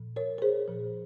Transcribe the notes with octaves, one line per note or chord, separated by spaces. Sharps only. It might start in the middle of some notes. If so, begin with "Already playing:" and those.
Already playing: A#2 F3
A#4 C#5
A#4
G#4 C5
A#2 F3